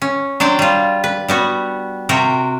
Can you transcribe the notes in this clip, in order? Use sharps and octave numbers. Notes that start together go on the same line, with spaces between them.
C#4
F#3 D4 C5 D5 G5
G3 F4
B4
G3 B3 F#4
C3 F#4 A#4 G5